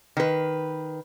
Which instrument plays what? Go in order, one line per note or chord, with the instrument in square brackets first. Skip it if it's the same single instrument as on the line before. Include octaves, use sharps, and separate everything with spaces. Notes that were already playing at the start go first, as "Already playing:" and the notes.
[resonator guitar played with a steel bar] D#3 B4